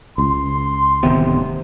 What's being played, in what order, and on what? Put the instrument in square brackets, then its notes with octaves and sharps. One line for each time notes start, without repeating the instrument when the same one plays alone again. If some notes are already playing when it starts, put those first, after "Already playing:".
[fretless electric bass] C#2 [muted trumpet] C6
[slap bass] D1 D#3 B3 [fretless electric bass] C3